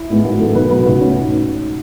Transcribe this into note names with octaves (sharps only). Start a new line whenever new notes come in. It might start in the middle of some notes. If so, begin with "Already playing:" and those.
Already playing: E4
A2 G#3 B3
G#1 F#4
F#2 E3 G#3 B3 A4
B1 B4
B2 F#3 B3 B4
C#2 F#4
B2 A3 C#4
G#2